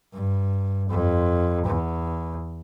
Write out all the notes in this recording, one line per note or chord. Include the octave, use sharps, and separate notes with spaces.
G2
F2
E2